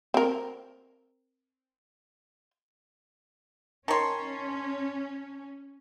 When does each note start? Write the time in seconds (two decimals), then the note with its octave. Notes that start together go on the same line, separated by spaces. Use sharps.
0.14 C4 A#4
3.88 D#3 C#4 C#5 A5 C6